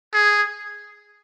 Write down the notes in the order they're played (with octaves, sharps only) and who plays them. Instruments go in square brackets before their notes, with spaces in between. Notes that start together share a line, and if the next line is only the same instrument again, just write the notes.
[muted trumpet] G#4